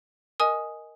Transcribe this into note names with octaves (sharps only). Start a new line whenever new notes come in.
A#4 D#5 G#5 D#6